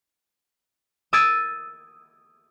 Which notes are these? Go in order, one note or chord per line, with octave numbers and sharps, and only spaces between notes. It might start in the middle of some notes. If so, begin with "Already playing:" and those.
D#6 E6 G#6 A6 D7 D#7